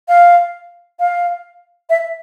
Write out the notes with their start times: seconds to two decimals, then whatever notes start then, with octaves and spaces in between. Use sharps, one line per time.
0.08 F5
1.00 F5
1.90 E5